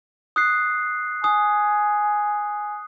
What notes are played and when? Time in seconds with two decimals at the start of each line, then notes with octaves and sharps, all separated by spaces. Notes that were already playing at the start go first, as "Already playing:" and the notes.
0.36 D#6 F#6 C7
1.24 G#5 D#6